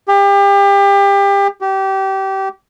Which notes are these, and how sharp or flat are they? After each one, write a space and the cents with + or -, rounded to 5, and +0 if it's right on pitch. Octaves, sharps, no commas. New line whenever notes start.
G4 +30
G4 -25